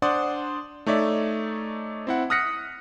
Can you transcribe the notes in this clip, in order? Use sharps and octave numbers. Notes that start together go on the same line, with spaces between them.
D4 C5 D5 F#5 C6 D#6
A3 D#4 C#5 D5 E5
C4 E4 F#5
D#6 F6 F#6 A#6 B6 C#7